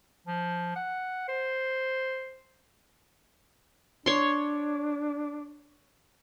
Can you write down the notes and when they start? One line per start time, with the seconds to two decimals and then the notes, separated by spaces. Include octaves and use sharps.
0.26 F3
0.76 F#5
1.29 C5
4.06 D4 C#5 C6